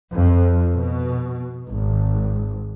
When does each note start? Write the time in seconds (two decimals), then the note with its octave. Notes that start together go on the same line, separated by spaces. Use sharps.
0.11 F2
0.73 B2
1.67 G#1